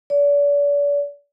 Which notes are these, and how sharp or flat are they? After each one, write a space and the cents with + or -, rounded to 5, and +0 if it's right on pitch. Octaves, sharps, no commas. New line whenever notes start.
D5 -40